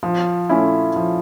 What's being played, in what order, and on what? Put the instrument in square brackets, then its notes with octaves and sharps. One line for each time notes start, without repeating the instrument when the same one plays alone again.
[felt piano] F3
A3 C#4 E4
F3